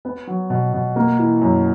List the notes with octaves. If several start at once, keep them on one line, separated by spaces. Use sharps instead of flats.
B3
F#3
B2
B2
A#3
E3
F#2